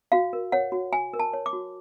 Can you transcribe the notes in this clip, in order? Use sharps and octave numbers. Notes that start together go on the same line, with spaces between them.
F#4 F5
A#4
C#5 F#5
F#4
F#4 G#5
A#4
A5
C#5
D6
F#4